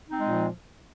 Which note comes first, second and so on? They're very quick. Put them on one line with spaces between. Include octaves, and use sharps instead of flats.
D#4 C4 G#3 A#2 F3